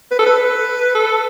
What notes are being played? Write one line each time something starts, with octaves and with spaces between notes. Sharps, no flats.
B4
A4
B4
A4